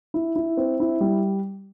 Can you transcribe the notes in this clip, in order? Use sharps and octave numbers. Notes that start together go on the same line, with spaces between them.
E4
E4
C4
E4
G3